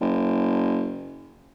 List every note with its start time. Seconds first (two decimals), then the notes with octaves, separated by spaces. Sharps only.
0.01 F#1